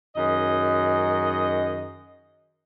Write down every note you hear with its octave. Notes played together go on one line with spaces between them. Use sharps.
F#2 D#3 G#4 D#5